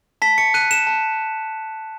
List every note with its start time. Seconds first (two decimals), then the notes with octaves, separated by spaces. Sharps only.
0.22 A5 B6
0.38 C#7
0.54 F#6 D#7
0.71 E7
0.87 A5